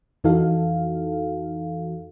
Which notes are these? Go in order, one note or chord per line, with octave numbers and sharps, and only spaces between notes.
F2 E3 D#4 F#4 A4 F5